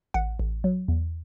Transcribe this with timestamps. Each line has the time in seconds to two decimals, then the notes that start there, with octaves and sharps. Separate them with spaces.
0.14 A1 F#5
0.40 A1
0.64 F#3
0.88 E2